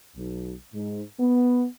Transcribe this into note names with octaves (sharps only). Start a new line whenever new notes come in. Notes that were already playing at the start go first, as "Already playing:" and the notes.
B1
G#2
B3